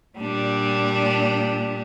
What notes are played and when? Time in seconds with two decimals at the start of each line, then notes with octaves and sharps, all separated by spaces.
0.18 A#2 G3 D4